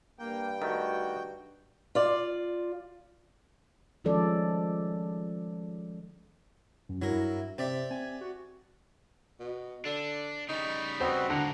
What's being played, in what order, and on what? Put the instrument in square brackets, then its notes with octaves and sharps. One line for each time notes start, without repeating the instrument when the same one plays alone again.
[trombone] G2 [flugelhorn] A#3 [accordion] G5
[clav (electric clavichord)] D#3 A3 [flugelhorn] F#4
[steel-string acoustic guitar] F4 D5
[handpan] D#3 F3 G#3 C#4 A4 D5
[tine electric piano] F#2
[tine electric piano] G2 [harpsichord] F#3 A#4 [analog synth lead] E4
[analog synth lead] C3 [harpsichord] G4 D5 E5 [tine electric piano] C5
[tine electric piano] C4 [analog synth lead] G#5
[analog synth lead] F#4
[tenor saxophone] B2
[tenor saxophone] D3 [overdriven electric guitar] D4
[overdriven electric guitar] C#3 G3 [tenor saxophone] D#4 [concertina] C#6
[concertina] B3 C4 F#4 [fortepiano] C5
[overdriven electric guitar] G#2 B2 [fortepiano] D3 F#5 [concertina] A#5